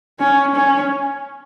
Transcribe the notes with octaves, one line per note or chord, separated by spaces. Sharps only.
C#4
C#4